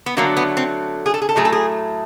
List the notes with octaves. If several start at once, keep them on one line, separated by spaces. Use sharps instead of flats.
B3
D3 F#3 A3 A#3
B3
C4
G#4
A4
G#4
A4
A2 F#3 A3 G#4
A4
G#4